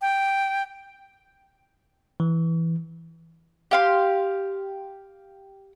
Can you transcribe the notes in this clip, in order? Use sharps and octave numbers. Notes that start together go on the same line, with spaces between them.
G5
E3
G4 F5 C6